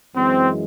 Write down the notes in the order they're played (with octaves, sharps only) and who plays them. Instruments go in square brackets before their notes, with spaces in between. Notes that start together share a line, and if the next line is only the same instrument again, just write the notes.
[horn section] F#2 E3 G#3 C4